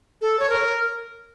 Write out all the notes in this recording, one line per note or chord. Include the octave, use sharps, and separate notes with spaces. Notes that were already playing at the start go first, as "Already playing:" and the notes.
A4
C#5
A#4